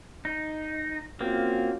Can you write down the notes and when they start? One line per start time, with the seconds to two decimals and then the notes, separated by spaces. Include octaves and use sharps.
0.25 D#4
1.21 A#3 C4 C#4 F4 F#4